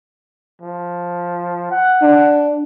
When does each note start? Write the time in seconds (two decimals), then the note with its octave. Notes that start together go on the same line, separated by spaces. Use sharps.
0.62 F3
1.71 F#5
2.02 D4